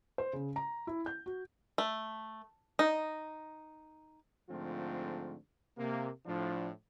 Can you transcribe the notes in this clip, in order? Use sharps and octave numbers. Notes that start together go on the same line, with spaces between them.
C5
C#3
A#5
E4
G6
F#4
A3
D#4
G#2 D3 F3 A3 C4 F4
C3 A#3
A2 F3 D4